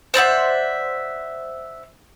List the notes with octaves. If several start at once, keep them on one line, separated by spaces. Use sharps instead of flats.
C5 D5 E5 F#5